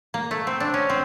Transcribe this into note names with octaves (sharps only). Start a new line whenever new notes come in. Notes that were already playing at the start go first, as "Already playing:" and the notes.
A#3
A3
C4
D4
C#4
C4